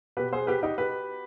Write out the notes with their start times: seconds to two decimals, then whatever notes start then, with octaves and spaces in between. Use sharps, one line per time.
0.17 B2 G4 B4
0.33 G#4 C5
0.47 G4 B4
0.63 D#4 G4
0.78 G4 B4